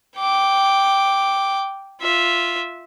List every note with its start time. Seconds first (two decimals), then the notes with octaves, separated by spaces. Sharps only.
0.17 G5 D6
2.01 F4 E5